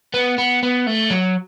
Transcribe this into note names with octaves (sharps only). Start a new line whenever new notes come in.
B3
B3
B3
A3
F#3